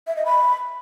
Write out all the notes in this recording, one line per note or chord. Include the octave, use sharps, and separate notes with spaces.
E5
D#5
B5